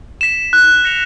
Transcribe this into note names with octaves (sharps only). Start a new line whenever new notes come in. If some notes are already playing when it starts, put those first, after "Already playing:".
B6 E7
F#6
A#6 C#7 F7